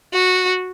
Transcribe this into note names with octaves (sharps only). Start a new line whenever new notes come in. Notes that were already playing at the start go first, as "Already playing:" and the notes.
F#4